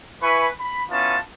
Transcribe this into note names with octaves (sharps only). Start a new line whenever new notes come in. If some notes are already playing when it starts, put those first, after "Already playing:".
E4 B4 G#5 B5 C#6
B5
B3 C#4 E4 F4 A5